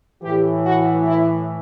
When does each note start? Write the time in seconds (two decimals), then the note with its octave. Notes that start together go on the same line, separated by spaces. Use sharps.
0.21 A2 E3 G4
0.64 F#4
1.04 E4